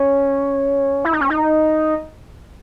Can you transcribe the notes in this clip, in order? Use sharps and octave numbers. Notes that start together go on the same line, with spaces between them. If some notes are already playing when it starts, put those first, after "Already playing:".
Already playing: C#4
E4
D#4
C#4
D#4